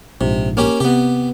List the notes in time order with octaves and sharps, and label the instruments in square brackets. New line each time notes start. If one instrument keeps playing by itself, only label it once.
[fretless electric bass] A#1 G#2 [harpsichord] C3
[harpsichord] A#3 C#4 G4
[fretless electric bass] C3 [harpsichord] B3 G4